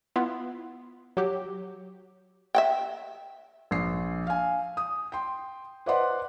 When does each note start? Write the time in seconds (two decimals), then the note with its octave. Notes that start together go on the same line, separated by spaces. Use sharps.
0.16 B3 E4 F4
1.17 F#3 G4
2.55 E5 F#5 G5
3.71 A#1 C7
4.27 F5 G#5
4.77 D#6
5.12 G5 C6
5.86 B4 C5 D5 D#5 F#5 C6